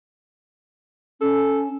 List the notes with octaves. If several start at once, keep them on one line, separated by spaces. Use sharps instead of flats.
C#4 A4